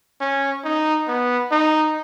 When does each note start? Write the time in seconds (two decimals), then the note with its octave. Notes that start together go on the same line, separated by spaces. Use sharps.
0.21 C#4
0.64 D#4
1.08 B3
1.52 D#4